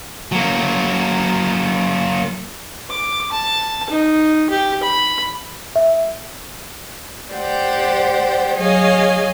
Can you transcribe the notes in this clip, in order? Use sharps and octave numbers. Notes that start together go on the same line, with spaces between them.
F#3 A#3
D6
A5
D#4
G4
B5
E5
G4 C5 D5 F#5 G5
F#3 G#4 C#5 D#5 F5 G#5